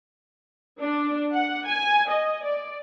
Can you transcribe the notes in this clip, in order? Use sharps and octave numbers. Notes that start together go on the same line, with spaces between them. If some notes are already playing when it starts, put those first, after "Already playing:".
D4
F#5
G#5
D#5
D5